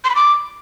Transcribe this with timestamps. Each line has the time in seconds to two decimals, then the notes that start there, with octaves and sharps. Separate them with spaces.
0.04 C6
0.10 B5
0.15 D6